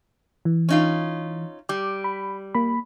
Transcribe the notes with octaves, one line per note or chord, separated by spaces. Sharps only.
E3
C#4 D#4 F4
G3 D6
B5
A#3 B5